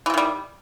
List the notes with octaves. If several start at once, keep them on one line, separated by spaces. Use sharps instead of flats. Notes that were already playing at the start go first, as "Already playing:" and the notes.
C3 D#3 E3 G3